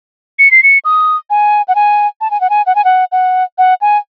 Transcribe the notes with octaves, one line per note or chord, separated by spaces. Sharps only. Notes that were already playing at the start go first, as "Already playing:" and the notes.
C#7
C7
C#7
D#6
G#5
F#5
G#5
A5
G#5
F#5
G#5
F#5
G#5
F#5
F#5
F#5
G#5